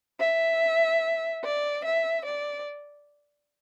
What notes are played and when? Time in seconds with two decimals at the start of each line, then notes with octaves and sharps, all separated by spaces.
0.20 E5
1.44 D5
1.85 E5
2.26 D5